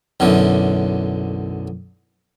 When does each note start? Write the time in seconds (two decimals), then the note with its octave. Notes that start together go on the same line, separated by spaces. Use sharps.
0.20 B1 F#2 D3 E3